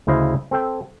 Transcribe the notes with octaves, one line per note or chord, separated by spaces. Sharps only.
D2 C#3 E4 C5 D#5 F5
C4 A4 G5